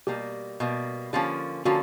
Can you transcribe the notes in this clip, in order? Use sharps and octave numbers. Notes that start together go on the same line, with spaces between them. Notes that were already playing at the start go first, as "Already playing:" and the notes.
B2 G3 A#3 G4
B2 G3 A#3
D3 F3 A#3 C#4 G4
D3 F3 A#3 C#4 F#4